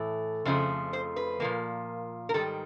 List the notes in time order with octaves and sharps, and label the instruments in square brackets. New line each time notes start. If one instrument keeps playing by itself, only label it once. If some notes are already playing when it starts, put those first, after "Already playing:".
Already playing: [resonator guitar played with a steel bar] A2 E3 A3
F2 C#3 F3 A3
C5
B4
A#2 F3 A#3
A#4
G#2 D#3 G3 A4